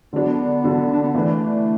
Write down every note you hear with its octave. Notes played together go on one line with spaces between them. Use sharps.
D3 F#3 B3 D4
D3 F#3 D4
D4
B3
E3 A3 D4